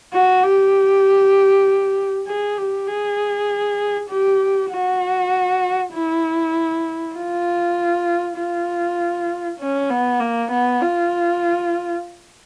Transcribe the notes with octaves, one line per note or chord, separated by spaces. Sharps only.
F#4
G4
G#4
G4
G#4
G4
F#4
E4
F4
F4
C#4
B3
A#3
B3
F4